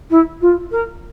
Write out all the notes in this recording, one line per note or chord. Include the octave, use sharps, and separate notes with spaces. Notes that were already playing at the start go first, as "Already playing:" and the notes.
E4
F4
A#4